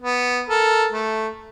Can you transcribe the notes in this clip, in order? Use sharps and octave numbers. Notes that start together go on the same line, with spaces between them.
B3
A4 A#4
A3